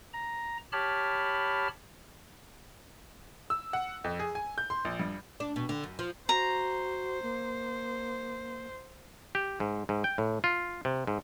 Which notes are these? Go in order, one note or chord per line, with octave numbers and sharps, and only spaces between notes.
A#5
G4 C#5 A5 B5 F6
E6
F#5
F2
G#4
G#5
G6
C6
A#1
G2
D4
B2
D3
F#2
F3
F#4 C5 A#5
A#3
G4
G#2
G#2
G5
A2
F4
C3
G#2